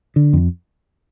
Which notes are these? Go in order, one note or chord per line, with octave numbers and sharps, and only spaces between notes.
D3
F2